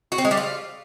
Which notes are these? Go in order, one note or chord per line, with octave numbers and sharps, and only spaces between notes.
F#4
C4
G#3
G3
F4